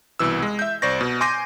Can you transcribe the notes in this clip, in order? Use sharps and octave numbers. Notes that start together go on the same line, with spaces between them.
C2 B2 E3 E6
G#3
E5 G6
C2 C5 D5 C#6 A#6
B2
G#5 C6 D6 G6 A#6 D#7